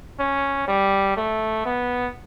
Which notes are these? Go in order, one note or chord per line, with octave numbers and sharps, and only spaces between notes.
C#4
G3
A3
B3